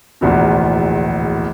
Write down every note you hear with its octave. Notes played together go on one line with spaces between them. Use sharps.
D1 A#1 E2 B2